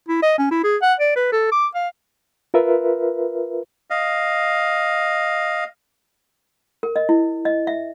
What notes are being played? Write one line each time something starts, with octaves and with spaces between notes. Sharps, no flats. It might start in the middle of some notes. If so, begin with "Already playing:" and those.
E4
D#5
C#4
E4
G#4
F#5
D5
B4
A4
D6
F5
F4 A#4 B4 E5
D#5 F5
A#4
D#5
E4
D#5
E5